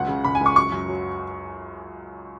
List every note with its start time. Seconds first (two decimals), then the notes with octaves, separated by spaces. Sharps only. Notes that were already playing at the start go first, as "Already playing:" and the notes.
Already playing: C#2 F#3 F#5
0.08 C#3
0.25 C#2 B5
0.35 G#5
0.41 C#2
0.46 C#6
0.56 F#2 C#6
0.72 F#2
0.88 F#3